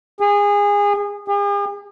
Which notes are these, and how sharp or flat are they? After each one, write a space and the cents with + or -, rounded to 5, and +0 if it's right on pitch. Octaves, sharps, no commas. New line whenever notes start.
G#4 -25
G#4 -45